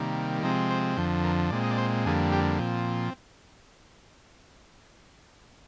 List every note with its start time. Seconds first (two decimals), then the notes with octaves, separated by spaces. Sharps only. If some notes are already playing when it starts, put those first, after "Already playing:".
Already playing: C3 D#3 G3 A#3
0.43 C3 F3 G#3 C4 D#4
0.70 C5
0.97 F2 D3 F3 C5
1.24 A#4
1.50 A#2 G#3 C4 D5
1.63 D#5
1.71 D5
1.78 C5
2.05 F2 D3 G3 A#3 G#4
2.32 G4
2.59 A#2 F3 C4